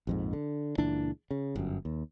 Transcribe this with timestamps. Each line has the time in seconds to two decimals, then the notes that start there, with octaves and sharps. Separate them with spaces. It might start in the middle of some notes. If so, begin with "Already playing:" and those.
0.07 A#1 F2 G#2
0.33 D3
0.78 C#2 A#2 E3 D4
1.31 C#3
1.56 G1 F#2
1.85 D#2